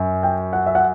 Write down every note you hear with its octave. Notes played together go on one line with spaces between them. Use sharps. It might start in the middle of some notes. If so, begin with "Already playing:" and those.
Already playing: F#2
G5
F#5
E5
F#5